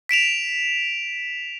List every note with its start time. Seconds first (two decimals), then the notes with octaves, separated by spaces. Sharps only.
0.09 B6 D7 E7 F7